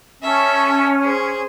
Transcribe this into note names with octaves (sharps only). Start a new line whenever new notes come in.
C#4 A4 E5
G#4 C5